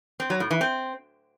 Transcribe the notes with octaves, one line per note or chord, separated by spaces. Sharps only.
C4
F#3
A2
E3
C4